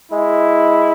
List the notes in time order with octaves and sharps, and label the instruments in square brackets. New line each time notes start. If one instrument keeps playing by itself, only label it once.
[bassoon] G#3 [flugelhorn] E4